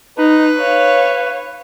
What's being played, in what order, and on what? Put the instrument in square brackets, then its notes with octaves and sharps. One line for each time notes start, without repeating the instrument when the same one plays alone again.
[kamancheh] D#4 [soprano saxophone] B4
[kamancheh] C#5 F5